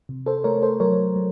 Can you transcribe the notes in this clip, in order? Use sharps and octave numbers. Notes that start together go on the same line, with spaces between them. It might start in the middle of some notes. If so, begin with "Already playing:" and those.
C3
A4 C5
A3 A#4 C#5
A4 C5
F#3 A#4 C#5
F#3